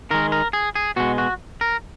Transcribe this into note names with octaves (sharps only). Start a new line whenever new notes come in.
D#3 G#3 A#4
A#4
G#4
G#4
B2 G#3 F#4
F#4
A#4